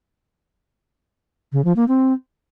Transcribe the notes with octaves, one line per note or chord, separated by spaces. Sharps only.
C#3
F3
A#3
C4